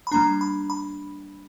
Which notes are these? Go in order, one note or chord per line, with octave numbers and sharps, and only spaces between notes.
B5
G3 A#3 D4 A#5
B5
B5